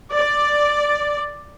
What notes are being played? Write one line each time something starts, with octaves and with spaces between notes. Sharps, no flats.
D5